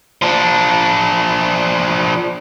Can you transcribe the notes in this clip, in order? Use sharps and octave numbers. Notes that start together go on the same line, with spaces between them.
F3 D4